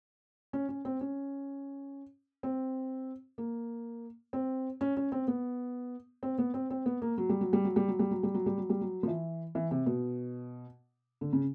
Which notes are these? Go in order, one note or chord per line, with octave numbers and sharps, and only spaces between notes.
C#4
C#4
C4
C#4
C4
A#3
C4
C#4
C#4
C4
B3
C4
B3
C4
C4
B3
A#3
F#3
G3
F#3
G3
F#3
G3
F#3
G3
F#3
G3
F#3
G3
F#3
G3
F#3
F3
E3
E3
C3
B2
D3
C#3